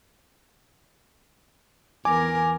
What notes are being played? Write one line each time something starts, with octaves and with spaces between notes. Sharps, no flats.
E2 A#4 G#5 D6